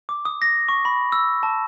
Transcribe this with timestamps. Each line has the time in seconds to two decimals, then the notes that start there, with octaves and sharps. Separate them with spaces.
0.09 D6
0.25 D#6
0.42 A#6
0.69 C#6
0.85 B5
1.12 E6
1.43 A5